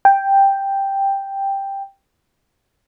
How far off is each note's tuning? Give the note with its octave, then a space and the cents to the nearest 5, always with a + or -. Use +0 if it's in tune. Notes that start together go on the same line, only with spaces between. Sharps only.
G5 +5